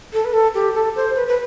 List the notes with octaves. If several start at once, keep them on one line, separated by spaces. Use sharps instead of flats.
A4
B4
A4
G4
A4
C5
B4
B4